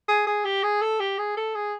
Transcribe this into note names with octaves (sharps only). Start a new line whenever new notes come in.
G#4
G#4
G4
G#4
A4
G4
G#4
A4
G#4